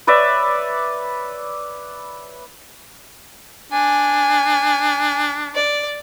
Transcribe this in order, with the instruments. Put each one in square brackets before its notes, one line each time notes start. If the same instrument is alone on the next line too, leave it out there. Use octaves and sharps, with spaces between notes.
[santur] B4 C#5 D5 E5
[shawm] D4 [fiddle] G#5
[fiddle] D5